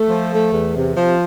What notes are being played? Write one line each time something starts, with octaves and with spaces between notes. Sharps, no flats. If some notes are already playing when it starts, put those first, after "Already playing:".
Already playing: A3
F3
A3
E2
C3
F3